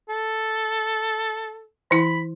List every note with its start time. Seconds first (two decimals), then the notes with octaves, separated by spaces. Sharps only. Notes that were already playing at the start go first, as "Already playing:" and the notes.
0.09 A4
1.91 E3 E4 B5